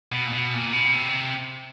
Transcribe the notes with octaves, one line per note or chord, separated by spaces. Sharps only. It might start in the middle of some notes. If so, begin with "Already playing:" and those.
B2
A#2
B2
A#2
B2
C3